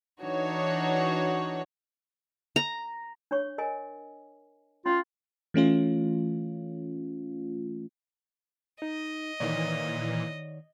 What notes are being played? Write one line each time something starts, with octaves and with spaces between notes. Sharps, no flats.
E3 D4 D#4 F#4 C#5
A#5
D4 C#5 C#6
A#4 D#5 G#5
C#4 F4 C6
E3 A3 C#4 F4
D#4 D#5
A#2 D#3 E3 C#5 D5